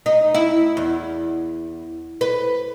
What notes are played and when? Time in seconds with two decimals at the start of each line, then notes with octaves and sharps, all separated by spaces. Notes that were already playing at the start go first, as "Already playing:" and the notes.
0.06 D#4
0.35 E4
0.77 E2
2.21 B4